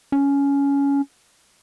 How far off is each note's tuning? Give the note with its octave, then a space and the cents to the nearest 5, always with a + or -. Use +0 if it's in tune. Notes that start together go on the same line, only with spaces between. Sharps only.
C#4 +15